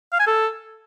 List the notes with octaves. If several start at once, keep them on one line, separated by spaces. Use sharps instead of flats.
F5
G#5
A4